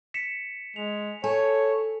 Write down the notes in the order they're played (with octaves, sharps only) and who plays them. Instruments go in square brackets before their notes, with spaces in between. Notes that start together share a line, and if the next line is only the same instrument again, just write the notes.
[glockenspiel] B6 C#7 E7
[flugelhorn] G#3 [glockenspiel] F7
[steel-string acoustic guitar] A4 [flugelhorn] C#5 [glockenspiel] G#5